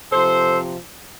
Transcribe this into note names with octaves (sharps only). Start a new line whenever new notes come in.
C3 F3 A4 C5